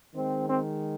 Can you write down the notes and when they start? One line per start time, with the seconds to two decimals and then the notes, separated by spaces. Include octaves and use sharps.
0.14 D#3 G#3 C4
0.49 C4